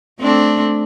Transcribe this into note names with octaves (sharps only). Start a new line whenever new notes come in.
A3 C4 D4